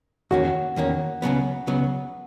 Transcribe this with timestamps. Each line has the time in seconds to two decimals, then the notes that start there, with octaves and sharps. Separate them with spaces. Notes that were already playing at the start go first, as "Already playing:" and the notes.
0.31 E2 D#3 A#3 C#4 F#4
0.76 E2 D#3 A#3 C#4
1.22 C#2 C#3 F#3 B3
1.67 C#2 C#3 F#3 B3